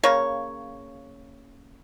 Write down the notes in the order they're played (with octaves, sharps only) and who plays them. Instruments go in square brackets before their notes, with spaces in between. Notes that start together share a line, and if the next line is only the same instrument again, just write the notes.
[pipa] C#3 A#3 C#5